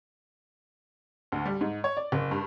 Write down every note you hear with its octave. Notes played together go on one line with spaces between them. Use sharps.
D2
G3
G#2
C#5
D5
F#1
G2